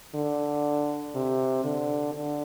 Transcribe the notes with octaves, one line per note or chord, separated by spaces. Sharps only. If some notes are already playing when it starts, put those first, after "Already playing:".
D3
C3
D3
D3